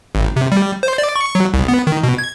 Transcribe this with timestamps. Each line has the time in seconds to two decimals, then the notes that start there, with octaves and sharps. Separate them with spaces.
0.15 G#1
0.36 C3
0.52 G3
0.83 C5
0.98 D5
1.16 C#6
1.35 F#3
1.54 C2
1.68 B3
1.87 D#3
2.03 B2
2.18 G#6